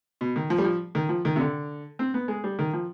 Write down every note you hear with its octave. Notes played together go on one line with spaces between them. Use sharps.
B2
D#3
F3
G3
F3
D#3
F3
D#3
C3
D3
C4
B3
G#3
G3
D#3
F3